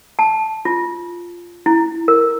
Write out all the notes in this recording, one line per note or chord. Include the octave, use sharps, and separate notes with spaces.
A5
F4
E4
A#4